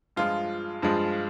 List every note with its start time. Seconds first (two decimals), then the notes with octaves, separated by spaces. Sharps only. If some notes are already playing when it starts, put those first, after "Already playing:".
0.16 G2 F3 G#3 F4
0.82 G2 F3 G#3